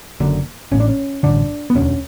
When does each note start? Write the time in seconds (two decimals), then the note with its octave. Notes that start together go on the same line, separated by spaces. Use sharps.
0.20 F#1 F#2 D3
0.71 A1 A2 C#4
0.80 D4
0.88 C#4
1.23 A1 G2 D3 D4
1.70 B3
1.75 E1 D2 D3 C#4